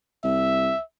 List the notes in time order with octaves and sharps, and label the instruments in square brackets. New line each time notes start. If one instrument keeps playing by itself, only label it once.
[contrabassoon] C2 [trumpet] E5